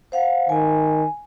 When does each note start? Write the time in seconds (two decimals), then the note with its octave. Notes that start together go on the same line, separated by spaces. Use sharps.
0.12 C5 F5 F#5
0.49 D#3 G#5